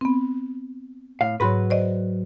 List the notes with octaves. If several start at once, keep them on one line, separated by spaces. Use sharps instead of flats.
B3 C4
A2 F5
G#2 F#3 F#4 B4 B5 C6
C5 D5 D#5